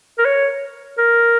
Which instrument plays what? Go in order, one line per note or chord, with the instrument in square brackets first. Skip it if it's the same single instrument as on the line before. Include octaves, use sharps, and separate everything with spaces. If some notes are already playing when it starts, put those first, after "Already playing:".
[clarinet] A#4
C#5
A#4